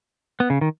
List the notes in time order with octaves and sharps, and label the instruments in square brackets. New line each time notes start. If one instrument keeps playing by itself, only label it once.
[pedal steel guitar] B3
C#3
D#3